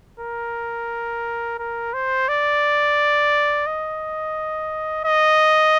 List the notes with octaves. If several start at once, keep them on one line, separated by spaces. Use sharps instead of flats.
A#4
A#4
C5
D5
D#5
D#5